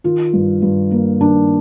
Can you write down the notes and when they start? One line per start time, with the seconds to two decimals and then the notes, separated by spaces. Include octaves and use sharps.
0.04 D#3 F4
0.33 G2
0.62 G2
0.91 A#3
1.20 D#3 D4